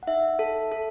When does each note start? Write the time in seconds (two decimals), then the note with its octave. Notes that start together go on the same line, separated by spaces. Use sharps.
0.03 F#5
0.07 D#4 E5
0.39 A4
0.72 A4